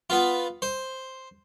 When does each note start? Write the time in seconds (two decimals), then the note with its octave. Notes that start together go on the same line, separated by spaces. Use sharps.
0.10 B3 F4
0.62 C5